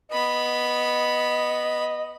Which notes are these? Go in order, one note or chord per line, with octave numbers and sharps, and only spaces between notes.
B3 D#5 B5